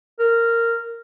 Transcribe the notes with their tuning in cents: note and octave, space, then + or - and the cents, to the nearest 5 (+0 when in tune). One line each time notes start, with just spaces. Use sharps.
A#4 -10